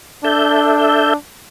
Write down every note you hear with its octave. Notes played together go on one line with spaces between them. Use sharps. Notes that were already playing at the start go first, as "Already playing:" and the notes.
D4 A4 E5 G6